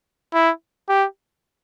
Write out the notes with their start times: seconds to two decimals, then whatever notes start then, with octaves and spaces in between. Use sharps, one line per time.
0.34 E4
0.89 G4